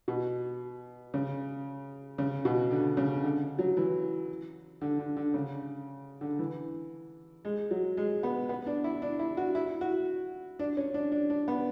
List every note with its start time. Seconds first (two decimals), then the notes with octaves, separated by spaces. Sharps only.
0.08 B2
1.14 C#3
2.18 C#3
2.45 B2
2.71 D3
2.97 C#3
3.24 D3
3.59 F#3
3.77 E3
4.81 D3
4.99 D3
5.17 D3
5.34 C#3
6.21 D3
6.39 E3
7.45 G#3
7.71 F#3
7.97 G#3
8.23 B3
8.49 B3
8.66 D4
8.84 E4
9.02 D4
9.19 E4
9.37 F#4
9.55 E4
9.81 F#4
10.59 D4
10.77 C#4
10.94 D4
11.12 D4
11.30 D4
11.48 B3